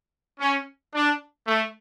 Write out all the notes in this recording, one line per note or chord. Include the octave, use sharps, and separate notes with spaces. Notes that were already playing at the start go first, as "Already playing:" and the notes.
C#4
D4
A3